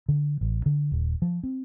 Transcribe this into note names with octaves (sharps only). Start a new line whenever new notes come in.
D3
A1
D3
D#1
F3
C4